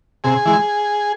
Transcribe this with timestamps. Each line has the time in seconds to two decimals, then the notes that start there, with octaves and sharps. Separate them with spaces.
0.24 C3 G#4
0.45 E3 G#3